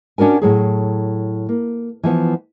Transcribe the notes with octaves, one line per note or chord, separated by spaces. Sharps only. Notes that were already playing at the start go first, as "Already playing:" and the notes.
C#4 D4 F#4 A#4 G#5
A2 F#3 G#4
A#3
E3 F3 B3